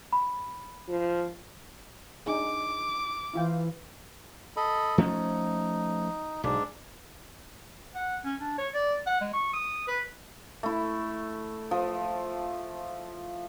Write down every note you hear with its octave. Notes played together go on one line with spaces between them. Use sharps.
B5
F3
D4 D#4 G#4 D6
E3 E4 F4 G5
A4 D#5 B5
F3 A3 C#4 D#4
B1 G#2 D4
F#5
C#4
D4
C#5
D5
F#5
G#3
C#6
D#6
B4
A3 E4
F3